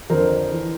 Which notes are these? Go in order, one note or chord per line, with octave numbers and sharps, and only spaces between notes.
F2 D3 A#4 C5
E3